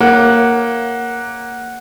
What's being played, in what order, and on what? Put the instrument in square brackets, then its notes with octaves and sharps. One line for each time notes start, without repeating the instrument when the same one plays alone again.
[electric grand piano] A#3 [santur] F#5